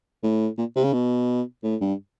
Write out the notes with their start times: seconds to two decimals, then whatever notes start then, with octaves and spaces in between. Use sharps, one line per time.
0.23 A2
0.58 A#2
0.76 C3
0.84 C#3
0.93 B2
1.63 A2
1.81 G2